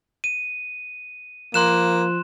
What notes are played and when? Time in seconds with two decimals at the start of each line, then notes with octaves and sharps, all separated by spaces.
0.24 D#7
1.54 F3 A#3 C6 F#6 E7